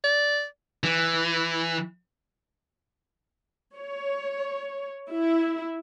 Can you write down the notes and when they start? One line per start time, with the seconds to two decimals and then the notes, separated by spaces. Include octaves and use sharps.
0.04 D5
0.84 E3
3.76 C#5
5.10 E4